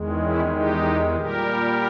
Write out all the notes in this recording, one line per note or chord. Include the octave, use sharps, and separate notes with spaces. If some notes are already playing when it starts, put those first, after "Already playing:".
Already playing: E2 D#3 G#3
C#4 E4
D#4 G4
A#2 G3 G4 A#4